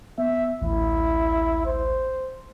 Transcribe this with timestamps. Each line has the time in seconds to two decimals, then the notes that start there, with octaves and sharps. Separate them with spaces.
0.18 B3 E5
0.62 A1 D2 E4
1.66 C5